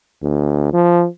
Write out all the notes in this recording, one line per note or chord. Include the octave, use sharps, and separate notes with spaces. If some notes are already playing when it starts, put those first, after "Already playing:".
D2
F3